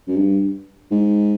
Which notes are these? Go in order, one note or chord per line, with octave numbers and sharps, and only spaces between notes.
F#2
G2
G#2